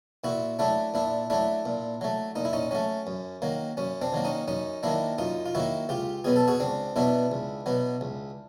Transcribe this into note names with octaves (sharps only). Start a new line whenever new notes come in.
A#2 E4 F#4
F#3 A3 D4 E4
A#2 D4 E4
F#3 A3 D4 E4
A#2
F#3 A3
A#2 D#4
E4
C#4 D#4
F#3 A3 C#4
F#2
D#3 F#3 A#3
F#2 C#4
C4 D4
D#3 F#3 A#3
C#4 D#4
F#2 C#4 D#4
D#3 F#3 A#3 D4 E4
F#2 D#4 F4
F4
D#3 F#3 A#3 E4 F#4
C#2 F4 G4
B2 F#3 B3 G#4
A4
F#4 G#4
C#2 C4 D4
B2 F#3 B3 D4 E4
C#2
B2 F#3 B3
C#2